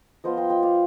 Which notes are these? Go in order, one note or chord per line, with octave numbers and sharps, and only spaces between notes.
F3 B3 F4 C5 D#5
D#5 G5
D#5 G5
D5 F5